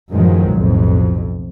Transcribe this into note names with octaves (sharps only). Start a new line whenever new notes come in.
F#2 A2 D#3 F3 F#3 G#3
B1 F2 A2